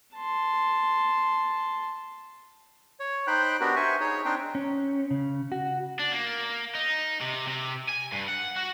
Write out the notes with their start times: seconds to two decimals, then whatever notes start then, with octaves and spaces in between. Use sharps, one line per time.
0.16 A5 C6
3.00 C#5
3.27 D#4 C5 G5 B5 F#6
3.61 B3 D4 F#4 G4 A#4 B4
3.76 C5 E5 G#5 C#6
4.00 D#4 G#4 C#5
4.25 C4 D4 D#4 C5 G5
4.55 C#4
5.11 C#3
5.52 F#4
6.00 D4
6.12 A#3
6.75 D#4
7.21 C3
7.48 C3
7.89 G#5
8.12 G2
8.28 F#5
8.56 F#4